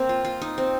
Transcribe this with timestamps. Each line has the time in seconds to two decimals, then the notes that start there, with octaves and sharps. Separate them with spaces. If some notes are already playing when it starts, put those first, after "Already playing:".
Already playing: A#3 C4
0.09 F4
0.25 F4
0.42 D#4
0.58 C4